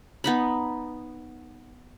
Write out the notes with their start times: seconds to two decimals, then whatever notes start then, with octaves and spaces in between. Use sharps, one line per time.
0.24 B3 D#4 B5